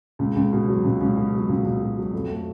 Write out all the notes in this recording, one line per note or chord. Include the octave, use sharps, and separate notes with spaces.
C#2
C#2
B2
F#3
C#2
C#2
B2
F#3
C#2
C#2
B2
F#3
F2
A3